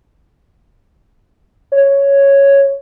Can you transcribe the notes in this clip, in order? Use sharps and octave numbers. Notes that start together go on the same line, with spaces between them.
C#5